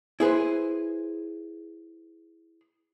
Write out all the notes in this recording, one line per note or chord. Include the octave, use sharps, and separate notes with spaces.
E4 G#4 B4 C5